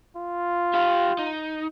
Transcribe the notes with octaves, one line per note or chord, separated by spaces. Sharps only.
F4
G4 F5
D#4